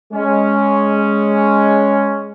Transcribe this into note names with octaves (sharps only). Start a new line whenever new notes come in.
G#3 C#4